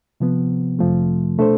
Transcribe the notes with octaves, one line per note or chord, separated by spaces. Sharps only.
C3 F3 B3
F2 C3 F3 A3
B2 A3 D4 A4 C5